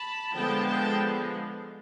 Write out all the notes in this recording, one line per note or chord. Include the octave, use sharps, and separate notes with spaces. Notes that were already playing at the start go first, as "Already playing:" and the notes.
Already playing: A5 B5
D3 F3 G#3 B3 G5 A5
G5 A5